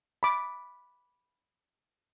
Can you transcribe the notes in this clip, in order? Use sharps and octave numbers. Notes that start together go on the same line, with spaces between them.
B5 D6